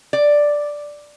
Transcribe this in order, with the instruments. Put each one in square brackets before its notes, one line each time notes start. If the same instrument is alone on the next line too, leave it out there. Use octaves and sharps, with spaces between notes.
[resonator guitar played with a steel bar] D5